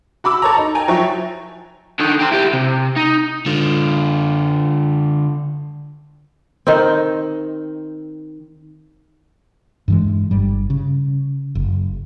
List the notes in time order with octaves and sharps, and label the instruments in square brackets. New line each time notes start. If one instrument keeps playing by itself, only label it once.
[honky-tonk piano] F#4 B5 D6 E6
A4 C#5 A#5
D#4
G5 G#5 A#5
F3 F#3 E4 C#5 G5
[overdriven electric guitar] D3 D#3
G4 C5
E4 G4
C3
D#4
D3 F4
[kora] D#3 C4
[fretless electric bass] G2 E3 G#3
G1 G2 G3
C#3
F#1